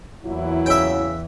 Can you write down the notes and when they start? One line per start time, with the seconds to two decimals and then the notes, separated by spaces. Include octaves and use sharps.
0.24 E2 A#2 E3 F#3 E4
0.66 C#3 E5 G5